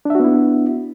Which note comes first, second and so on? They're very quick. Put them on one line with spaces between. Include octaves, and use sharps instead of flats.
D4 E5 F#4 B3 E4